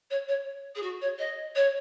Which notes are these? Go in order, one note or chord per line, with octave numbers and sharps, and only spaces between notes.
C#5
C#5
G#4
F#4
C#5
D#5
C#5